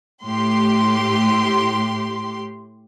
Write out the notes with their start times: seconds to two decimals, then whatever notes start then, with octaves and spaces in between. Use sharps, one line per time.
0.24 A2 G4 C6